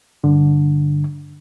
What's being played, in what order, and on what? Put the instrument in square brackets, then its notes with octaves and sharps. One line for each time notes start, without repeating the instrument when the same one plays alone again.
[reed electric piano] G2 D3